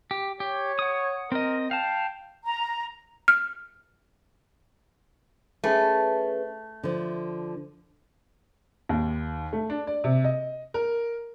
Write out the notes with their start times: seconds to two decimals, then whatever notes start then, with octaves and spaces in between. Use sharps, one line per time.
0.11 G4
0.40 G4 C#5
0.79 F#5 D#6
1.32 C4 A#4 D#5
1.71 F5 G5 A5
2.46 A#5
3.28 F6
5.64 A3 C#4 G#4 B4
6.83 D3 F3
8.89 D#2
9.53 A3
9.70 D4
9.87 D5
10.04 C3
10.24 D#5
10.74 A#4